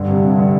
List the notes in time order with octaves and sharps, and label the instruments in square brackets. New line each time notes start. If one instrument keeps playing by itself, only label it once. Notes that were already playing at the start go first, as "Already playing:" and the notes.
Already playing: [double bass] G2 [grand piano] D3
[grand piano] C3
C3
D3